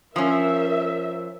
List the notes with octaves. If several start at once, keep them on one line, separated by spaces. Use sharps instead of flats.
F3 C#4 A#4 E5